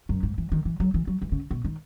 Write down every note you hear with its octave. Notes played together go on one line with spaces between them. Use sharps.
F#2
G#2
E3
D#3
E3
F#3
E3
F#3
E3
C#3
B2
D#3